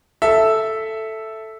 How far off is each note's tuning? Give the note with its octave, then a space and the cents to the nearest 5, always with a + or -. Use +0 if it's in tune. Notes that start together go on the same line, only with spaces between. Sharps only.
A4 +0 E5 +0